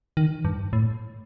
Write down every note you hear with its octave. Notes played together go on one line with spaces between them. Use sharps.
D#3
G2
A2